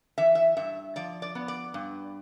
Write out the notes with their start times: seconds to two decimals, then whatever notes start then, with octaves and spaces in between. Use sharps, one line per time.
0.18 E3 E5
0.35 E5
0.57 G2 E5
0.96 F3 D5
1.22 D5
1.35 B3
1.48 D5
1.74 G2